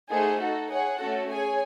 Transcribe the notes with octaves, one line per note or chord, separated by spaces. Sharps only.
A3 D#4 G#4 C5 F#5
D#4 F#4 A4
G#4 C#5 F#5
A3 C#4 F#4 A4
G#4 C#5 G#5